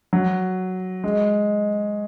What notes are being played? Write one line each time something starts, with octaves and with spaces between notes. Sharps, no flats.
F#3
G#3